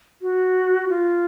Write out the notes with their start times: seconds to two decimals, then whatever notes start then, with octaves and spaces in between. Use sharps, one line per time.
0.22 F#4
0.89 F4